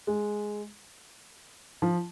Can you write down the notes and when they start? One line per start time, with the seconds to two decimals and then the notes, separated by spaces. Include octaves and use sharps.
0.07 G#3
1.82 F3